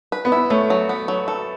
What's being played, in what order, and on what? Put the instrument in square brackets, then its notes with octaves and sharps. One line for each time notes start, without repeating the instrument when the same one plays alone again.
[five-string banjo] B4
[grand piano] B3
[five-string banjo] E4
[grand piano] A3 [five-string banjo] C#4
[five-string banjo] F#3
B3
F#3
A4